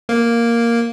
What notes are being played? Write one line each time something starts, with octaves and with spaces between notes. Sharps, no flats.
A#3